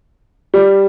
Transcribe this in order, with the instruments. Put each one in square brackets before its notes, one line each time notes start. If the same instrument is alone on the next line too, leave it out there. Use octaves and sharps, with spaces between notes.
[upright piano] G3